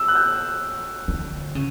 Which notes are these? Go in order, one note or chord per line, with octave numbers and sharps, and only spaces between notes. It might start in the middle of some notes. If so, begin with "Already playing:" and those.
Already playing: E6
F#6
G6
D3
C#3